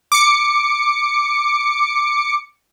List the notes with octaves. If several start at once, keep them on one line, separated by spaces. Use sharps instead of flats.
D6 C#7